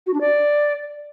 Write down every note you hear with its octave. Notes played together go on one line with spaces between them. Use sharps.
F#4
D4
D5